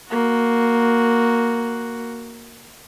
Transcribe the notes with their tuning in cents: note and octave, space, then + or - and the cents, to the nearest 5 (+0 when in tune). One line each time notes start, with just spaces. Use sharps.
A#3 +0 F#4 +0